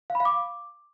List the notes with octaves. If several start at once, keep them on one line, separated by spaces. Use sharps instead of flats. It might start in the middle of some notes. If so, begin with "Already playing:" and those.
F5
B5
F5
D6